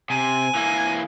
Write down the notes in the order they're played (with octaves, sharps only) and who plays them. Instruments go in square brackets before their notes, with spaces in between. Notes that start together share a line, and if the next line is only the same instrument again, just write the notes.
[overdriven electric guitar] C3 [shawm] G#5
[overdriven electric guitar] E3 A#3